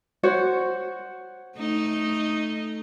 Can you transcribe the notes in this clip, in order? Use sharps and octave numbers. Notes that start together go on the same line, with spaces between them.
F#4 C5 C#5
A3 D#4